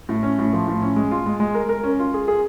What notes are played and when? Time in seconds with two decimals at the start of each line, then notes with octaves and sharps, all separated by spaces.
0.09 A2
0.23 C#4
0.39 A2
0.53 F3
0.68 A2
0.82 C#4
0.96 G#3
1.11 F4
1.26 G#3
1.40 G#3
1.55 A#4
1.69 A#4
1.84 C#4
1.99 F4
2.14 G#4
2.28 G#4